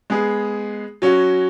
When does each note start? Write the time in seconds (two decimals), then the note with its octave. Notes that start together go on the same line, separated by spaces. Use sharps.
0.10 G#3 B3 G#4
1.02 F#3 C#4 F#4